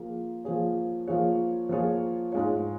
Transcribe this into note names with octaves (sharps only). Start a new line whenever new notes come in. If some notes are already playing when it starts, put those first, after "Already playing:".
Already playing: F3 A#3 F4 G#4
F3 A#3 F4 G#4 C#5
F3 A#3 F4 G#4 C#5
F3 A#3 F4 G#4 C#5
G#2 G#3 F4 C#5